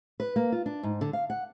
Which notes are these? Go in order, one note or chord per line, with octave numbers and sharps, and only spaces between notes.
B4
A#3
F4
D4
G#2
D3
F5
F#5